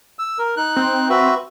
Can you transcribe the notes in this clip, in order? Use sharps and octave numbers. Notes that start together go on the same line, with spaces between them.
E6
A#4
D#4 F#6
C4
F#4 B4 E5